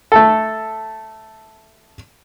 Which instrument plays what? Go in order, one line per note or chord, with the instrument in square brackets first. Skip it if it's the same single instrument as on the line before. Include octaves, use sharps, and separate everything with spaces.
[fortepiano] A3 A4